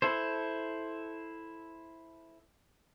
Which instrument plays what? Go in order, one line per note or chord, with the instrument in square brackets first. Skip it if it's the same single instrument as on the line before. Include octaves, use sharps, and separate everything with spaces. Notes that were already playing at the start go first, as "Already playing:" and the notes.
[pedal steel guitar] E4 A4 C5